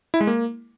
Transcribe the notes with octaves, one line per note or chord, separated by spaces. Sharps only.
E4
G#3
A#3